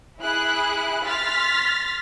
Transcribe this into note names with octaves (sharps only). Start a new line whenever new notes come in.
E4 G#4 F#6
C6 F6 A6 B6